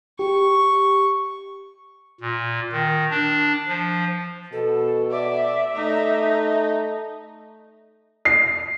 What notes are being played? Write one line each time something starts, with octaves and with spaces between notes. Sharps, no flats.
G4 C#6
A#2
D#3
D4
F3
B2 A4
D5 E5
A3 D#4
C7